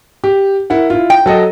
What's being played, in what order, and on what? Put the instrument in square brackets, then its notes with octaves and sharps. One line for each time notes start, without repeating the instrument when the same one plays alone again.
[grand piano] G4
E4 A#4 F#5
E4 F4
[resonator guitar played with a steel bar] G5
[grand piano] F#3 A4 D#5